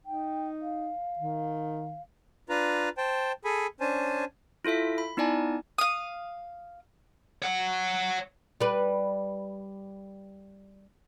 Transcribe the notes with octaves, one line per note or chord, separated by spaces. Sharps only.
D#4 G5
F5
D#3
D4 F4 B4 A#5
C5 G5 A5
G#4 A4 G#5 B5
C#4 D4 C5 G#5 A5
E4 F4 A4 E5 B6
B5
B3 D#4 E4 D5 G#5 A5
F5 D#6
C#5 F#5
G3 B4